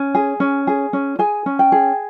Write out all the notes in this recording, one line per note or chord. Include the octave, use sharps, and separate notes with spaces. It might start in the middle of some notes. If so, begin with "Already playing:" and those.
Already playing: C#4
G#4
C#4
G#4
C#4
G#4 G#5
C#4
G5
G#4